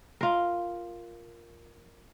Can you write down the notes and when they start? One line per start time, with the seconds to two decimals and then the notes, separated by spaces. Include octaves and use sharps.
0.21 F4 A#4